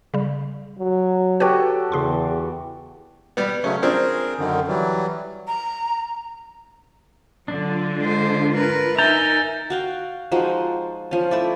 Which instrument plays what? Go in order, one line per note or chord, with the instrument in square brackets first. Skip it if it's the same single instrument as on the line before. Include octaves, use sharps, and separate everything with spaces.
[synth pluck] C#3 G3
[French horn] F#3
[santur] F#4 G4 A4 [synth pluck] B4 C#5
[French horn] E2 [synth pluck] C#3 G#4 C6
[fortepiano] G3 B3
[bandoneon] C#3 F#3 A3 [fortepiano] C#4
[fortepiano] F3 C4 D4 [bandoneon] G#4 A#4
[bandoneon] F#2 D3 D#3
E3 F#3 G3
[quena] A#5
[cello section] D3 F4 [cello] F#3 [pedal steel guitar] D4
[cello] G#3 C5
A#4 B4
[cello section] D#4 [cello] A#4 E5 [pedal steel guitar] G#5 A#5 [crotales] G6 A6 G7
[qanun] F#4 F5 G5
F3 G#3 D#4 F#4
F3 C#4
A3 E4 D5